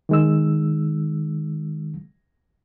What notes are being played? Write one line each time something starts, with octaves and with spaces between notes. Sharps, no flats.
D#3 G#3 E6